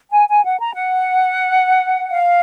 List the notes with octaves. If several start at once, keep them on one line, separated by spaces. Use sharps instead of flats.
G#5
G#5
F#5
A#5
F#5
F5